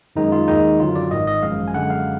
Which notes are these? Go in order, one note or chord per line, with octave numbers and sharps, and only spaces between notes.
F#2 D#3 G#3 D#4
F4
D#2 D#3 G#3 D#4
F#2 D3 F#3 F4
D5
G#1 G#2 D#3 D#5
D#5
G#1 F#2 F3 G#3 F5
G#5
F#2 D3 G#3 F#5
F5